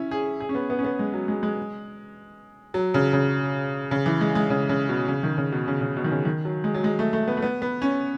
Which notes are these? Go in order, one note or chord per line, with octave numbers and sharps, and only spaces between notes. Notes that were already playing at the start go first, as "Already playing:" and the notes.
Already playing: C#4 E4
G#4
G#4
C#4
B3
B3
C#4
B3
G#3
F#3
G#3
G#3
F#3
C#3
C#3
C#3
E3
G#3
G#3
C#3
C#3
B2
C#3
D#3
C#3
B2
C#3
C#3
B2
D#3
C#3
D#3
F#3
G#3
F#3
G#3
A3
A3
B3
A3
B3
B3
C#4